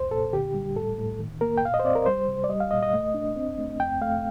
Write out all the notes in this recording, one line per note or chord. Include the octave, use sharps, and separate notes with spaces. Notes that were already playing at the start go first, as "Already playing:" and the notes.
Already playing: C2 F2 C5
A#2 A4
D3 G4
G3
A2 A4
A2
D#3
A#3 A#4
G5
A#2 F5
D#5
C5
C4 D5
A#4
G3 C5
C3
D5
G3 D#5
F5
A#2 D#5
D#5
A3
D4
C4
A3
F2 G5
A3 F5